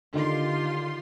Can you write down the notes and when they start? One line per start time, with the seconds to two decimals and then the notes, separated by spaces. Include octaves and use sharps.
0.14 D3 D#3 F4 G4 C6